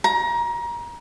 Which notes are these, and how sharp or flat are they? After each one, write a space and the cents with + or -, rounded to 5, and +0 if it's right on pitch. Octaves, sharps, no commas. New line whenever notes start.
A#5 +25